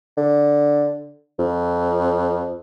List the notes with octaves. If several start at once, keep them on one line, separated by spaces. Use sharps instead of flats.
D3
F2